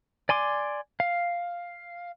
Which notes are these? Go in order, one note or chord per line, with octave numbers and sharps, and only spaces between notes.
D5 G#5 C6 D6
F5